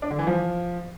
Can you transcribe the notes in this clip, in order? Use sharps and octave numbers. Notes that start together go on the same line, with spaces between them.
D4
D3
E3
F3